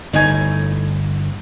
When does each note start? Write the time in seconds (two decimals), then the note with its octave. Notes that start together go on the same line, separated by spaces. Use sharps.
0.13 G1 A2 D#4 G#5